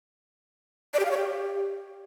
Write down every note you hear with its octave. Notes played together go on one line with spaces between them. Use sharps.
D5
G4
F5
C#5
G4